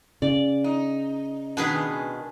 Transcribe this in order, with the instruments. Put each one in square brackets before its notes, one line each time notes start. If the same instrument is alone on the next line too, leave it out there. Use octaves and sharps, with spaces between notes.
[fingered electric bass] C#3 [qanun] D5
[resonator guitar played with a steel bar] D#4
[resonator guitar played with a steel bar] B2 D#3 G#3 [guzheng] D4 G#4 B4